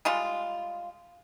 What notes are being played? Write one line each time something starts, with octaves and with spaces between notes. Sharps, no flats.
G3 G#3 F4